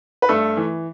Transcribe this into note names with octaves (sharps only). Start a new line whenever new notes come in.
B4
G2 A3 A4
E3